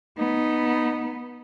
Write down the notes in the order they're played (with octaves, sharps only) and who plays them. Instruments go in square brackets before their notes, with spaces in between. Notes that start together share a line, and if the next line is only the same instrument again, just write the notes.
[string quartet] B3 [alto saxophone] D#4